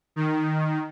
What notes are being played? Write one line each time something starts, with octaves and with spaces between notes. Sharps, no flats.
D#3